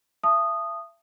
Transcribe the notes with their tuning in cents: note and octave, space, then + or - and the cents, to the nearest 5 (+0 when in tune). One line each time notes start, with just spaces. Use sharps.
E5 +40 A5 +0 D#6 -10